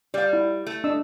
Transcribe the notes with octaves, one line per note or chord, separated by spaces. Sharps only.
G3 D5 F5
E4
A3
D4 D#5 E6